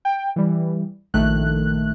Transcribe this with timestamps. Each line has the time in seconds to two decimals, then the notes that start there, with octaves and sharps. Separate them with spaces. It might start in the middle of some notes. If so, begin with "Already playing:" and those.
0.05 G5
0.36 E3 G3
1.14 A#1 D#3 A3 F#6